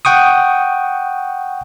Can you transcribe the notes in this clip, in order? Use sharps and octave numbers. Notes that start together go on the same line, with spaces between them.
F#5 G5 C#6 D#6